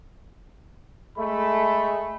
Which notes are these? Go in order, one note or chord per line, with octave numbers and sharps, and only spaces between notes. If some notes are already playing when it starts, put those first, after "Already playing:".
G#3 A3 B5